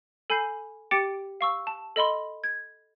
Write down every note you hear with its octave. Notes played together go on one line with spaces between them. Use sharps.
A4 G#5 B5 G6 C7
G4 G5 D6 A6 C#7 D7
F5 C#6 E6
A5
A4 D#5 B5 C6
G#6